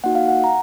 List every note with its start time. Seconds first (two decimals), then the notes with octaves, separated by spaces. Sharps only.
0.04 A#3 D#4 F#4 F#5
0.15 F5
0.29 F#5
0.44 A#5